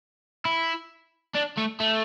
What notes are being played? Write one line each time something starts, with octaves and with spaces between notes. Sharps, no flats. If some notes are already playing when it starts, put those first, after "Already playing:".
E4
D4
A3
A3